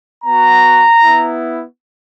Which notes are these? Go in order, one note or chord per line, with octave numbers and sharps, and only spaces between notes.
B3 F#4 A#5
B3 E4